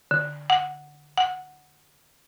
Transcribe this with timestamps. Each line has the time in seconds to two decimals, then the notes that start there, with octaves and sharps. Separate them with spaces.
0.11 D3
0.50 F#5
1.18 F#5